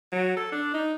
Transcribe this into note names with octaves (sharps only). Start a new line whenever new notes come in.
F#3
A4
D4
D#4